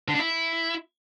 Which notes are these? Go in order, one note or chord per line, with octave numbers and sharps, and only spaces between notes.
D3
D4
E4